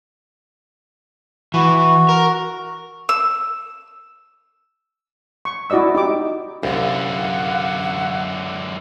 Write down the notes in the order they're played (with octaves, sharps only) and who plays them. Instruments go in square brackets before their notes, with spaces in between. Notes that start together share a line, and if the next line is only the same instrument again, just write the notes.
[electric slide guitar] E3 [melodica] F#4
[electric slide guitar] A#4
[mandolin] E6
[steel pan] C#6
E4 F#4 D5 D#5 E6
D#4 G4 D6
[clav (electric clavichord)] C2 [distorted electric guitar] F#2 D3 [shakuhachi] F5 [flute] F#5